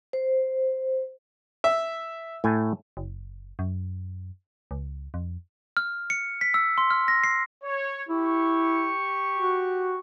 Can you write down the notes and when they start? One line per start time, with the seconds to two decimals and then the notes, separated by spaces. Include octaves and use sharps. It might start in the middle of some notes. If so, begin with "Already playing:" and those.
0.13 C5
1.64 E5
2.44 A2 A3 G#5
2.97 F#1
3.59 F#2
4.71 C#2
5.14 F2
5.77 F6
6.10 C#7
6.41 B6
6.54 E6
6.78 C6
6.91 F6
7.08 A#6
7.24 C7
7.64 C#5
8.09 E4 G4 C#6
9.37 F#4